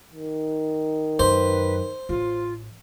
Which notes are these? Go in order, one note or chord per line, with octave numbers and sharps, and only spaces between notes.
D#3
F#2 B4 C5
A1 F4